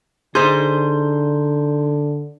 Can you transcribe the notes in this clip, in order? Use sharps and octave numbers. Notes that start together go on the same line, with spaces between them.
D3 D#4 G#4 C5 C6 G6